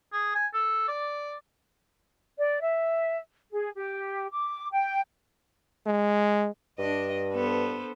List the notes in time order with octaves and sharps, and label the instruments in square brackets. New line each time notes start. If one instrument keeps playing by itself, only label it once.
[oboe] G#4
G#5
A4
D5
[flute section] D5
E5
G#4
G4
D6
G5
[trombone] G#3
[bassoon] G2 [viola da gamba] D4 D#5
[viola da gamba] B3 A4 C5